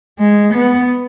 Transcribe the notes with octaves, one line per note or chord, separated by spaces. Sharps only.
G#3
B3